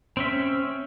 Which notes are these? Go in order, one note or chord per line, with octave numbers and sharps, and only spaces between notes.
C4 C#4 E5